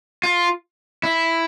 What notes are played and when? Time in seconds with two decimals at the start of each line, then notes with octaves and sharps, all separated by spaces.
0.23 F4
1.03 E4